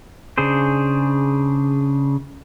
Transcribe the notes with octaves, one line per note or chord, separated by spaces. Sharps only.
C#3 D4 G#4 C5